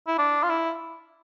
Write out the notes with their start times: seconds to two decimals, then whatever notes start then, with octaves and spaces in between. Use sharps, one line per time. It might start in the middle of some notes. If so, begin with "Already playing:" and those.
0.07 E4
0.18 D4
0.43 F4
0.49 E4